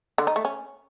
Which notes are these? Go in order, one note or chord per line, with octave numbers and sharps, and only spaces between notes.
D3
D#4
A3
C#4